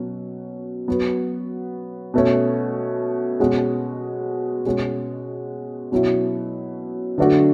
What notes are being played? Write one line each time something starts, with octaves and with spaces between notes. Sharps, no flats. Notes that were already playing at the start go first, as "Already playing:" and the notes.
Already playing: B2 F#3 C#4
F#3 B3 F#4
B2 A3 C#4
B2 G#3 C#4 F#4
B2 G#3 C#4 F#4
B2 F#3 C#4 E4
D3 F#3 A3 D4 F#4